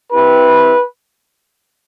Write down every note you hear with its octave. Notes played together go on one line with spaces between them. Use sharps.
C4 E4 G4 B4